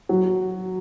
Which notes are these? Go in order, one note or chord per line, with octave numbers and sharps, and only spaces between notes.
F#3